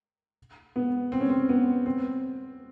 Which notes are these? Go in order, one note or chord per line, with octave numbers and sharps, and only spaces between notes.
B3
C4
C#4
C4
B3
C4